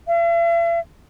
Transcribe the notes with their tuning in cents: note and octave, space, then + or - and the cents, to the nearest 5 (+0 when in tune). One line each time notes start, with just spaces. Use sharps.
E5 +45